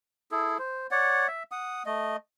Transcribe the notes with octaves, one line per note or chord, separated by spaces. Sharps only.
E4 G#4 A4
C5
C#5 D5 F#5
E5
F#5 D#6
A3 D#5